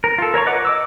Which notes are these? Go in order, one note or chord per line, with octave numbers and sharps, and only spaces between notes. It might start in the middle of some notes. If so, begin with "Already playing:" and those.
A#4
F4 A4
A#4 C#5 A#5 C#6
B4 D#5 F#5 D6
D#5 D6 E6